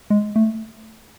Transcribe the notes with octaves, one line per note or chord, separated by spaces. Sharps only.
G#3
A3